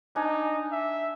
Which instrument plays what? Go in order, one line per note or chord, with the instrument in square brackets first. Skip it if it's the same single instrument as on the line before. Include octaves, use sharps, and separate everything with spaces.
[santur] D4 G#5 [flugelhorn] D#4
[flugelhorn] E5